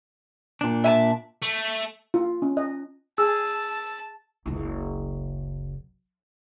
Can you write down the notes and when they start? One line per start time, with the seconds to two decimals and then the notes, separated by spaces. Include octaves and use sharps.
0.61 A#2 D4
0.84 E5 G#5 A5
1.42 A3
2.14 F4
2.42 C#4
2.57 D#5
3.18 G#4 A5 E6
4.46 F#1 C#2